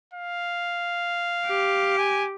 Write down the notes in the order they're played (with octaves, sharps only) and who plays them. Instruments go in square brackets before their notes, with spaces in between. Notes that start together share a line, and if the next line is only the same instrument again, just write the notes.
[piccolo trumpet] F5
[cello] G4
[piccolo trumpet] G#5